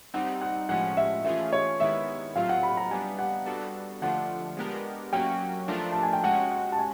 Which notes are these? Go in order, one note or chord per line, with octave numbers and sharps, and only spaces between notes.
G3 C4 D#4 F#5
F#5
A2 F3 G#3 C#4 F#5
E5
E3 A3 C#4 F4 G#4 E5
C#5
D#3 G#3 B3 E4 E5
A2 F#3 A3 C4 F4 F5
F#5
B5
A#5
G3 B3 D4 G#5
F#5
G3 B3 D4 F#4 A4
D3 F3 A3 D4 F4 F#5
G#3 B3 D4 G4 A#4
F#3 A#3 C#4 F#4 G5
F3 A3 D4 F4 A#4
A5
G#5
G5
G#3 C#4 F#4 F#5
F#5
A5
G#5